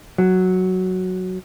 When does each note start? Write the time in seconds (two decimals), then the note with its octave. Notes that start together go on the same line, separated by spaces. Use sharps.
0.18 F#3